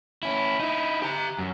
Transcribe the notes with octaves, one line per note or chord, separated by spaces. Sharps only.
C#4 E4
D#4 E4
G4 A#5
F#2